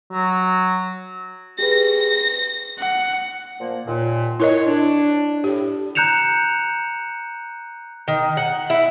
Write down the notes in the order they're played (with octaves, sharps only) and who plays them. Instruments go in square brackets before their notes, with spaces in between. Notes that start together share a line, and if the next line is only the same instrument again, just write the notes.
[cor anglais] F#3
[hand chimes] G4 G#4 B4 [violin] A#6
[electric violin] F#5
[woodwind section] A#2 F3 A#3
D#2 A#2
[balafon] E4 A#4 D#5 [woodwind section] C#5
[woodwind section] D4
[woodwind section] A2 [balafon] G4
[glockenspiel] A#5 F#6 G6 C#7 E7 F7
[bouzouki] D#3
F#5
E4